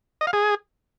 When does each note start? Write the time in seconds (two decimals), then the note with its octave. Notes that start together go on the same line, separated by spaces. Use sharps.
0.21 D#5
0.27 F5
0.33 G#4